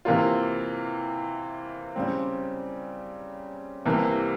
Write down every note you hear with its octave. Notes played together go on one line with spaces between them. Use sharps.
C3 E3 A#3 F4
C#3 G3 C4
C2 C3 E3 A#3